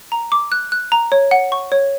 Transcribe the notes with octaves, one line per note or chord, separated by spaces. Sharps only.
A#5
D6
F#6
F#6
A#5
C#5
F#5
C#6
C#5